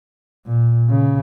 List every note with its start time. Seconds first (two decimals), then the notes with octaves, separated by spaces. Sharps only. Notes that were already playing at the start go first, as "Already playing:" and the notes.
0.46 A#2
0.90 C#3